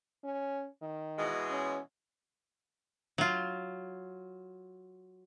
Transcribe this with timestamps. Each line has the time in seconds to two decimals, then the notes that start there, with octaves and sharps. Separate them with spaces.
0.24 C#4
0.82 D#3
1.18 B2 E3 G#3
1.50 C#4
3.18 F#3 F4